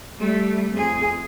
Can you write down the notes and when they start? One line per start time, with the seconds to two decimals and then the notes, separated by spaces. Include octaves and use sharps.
0.18 G3 A3
0.71 F2 G#4